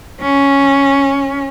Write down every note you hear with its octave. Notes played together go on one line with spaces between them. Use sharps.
C#4